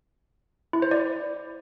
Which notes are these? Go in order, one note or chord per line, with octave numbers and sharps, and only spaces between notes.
E4
C5
D5